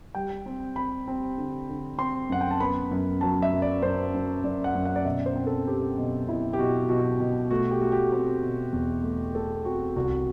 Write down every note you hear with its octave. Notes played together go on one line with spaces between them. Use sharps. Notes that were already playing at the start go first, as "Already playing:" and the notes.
G3 G5
C4
C4 B5
C4
D3
D3
C4 C6
F#2 F#5
G5
A5
B3 B5
F#2
F#3 A5
E5
F#2
D5
F#2 C5
F#2
F#2 D5
F#5
F#2
F#5
D5
B2 E5
C5
C4
A4
C4 G4
B2
B2 E4
G4
B2 F#4
B2 F#4
B2
A3 F#4
G4
A3 F#4
G4
C4
B2
E2
A3
A3 A4
C4 F#4
C2 F#4